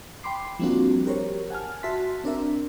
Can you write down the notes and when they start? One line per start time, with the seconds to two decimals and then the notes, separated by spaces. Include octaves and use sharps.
0.23 G5 B5 C6 D6 C7
0.59 F3 G3 A#3 C4 D4 F#4
1.05 F#4 G4 A#4 C5 C#5
1.50 F#5 G#5 A5 F6
1.83 F#4 E5 A5 C6 B6
2.24 C4 D4 A#4 E5